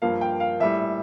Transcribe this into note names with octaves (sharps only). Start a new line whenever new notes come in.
G2 F3 A#3 F5
G5
F5
A#1 A2 G3 E5